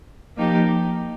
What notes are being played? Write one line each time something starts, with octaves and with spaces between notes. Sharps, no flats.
F3 A#3 D#4 G4